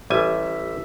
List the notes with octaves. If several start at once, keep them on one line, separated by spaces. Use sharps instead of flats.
A1 G3 E5 G#5